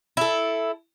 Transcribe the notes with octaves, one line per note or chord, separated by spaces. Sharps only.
E4 A4